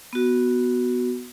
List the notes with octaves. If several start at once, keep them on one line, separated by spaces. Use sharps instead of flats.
B3 F#4